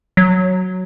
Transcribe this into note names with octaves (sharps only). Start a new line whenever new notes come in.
F#3